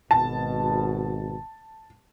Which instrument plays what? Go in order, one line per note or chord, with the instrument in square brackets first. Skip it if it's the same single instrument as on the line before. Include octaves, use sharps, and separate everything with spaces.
[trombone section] G#1 B2 [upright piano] A5